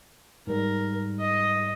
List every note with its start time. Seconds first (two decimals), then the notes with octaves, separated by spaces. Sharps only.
0.47 G#2 G3 A#4
1.19 D#5